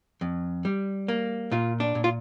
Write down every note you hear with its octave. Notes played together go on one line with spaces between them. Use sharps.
F2
G3
A#3
A#2 F4
D4
A#2
F4